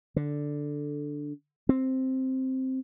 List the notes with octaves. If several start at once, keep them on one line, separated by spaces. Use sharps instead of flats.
D3
C4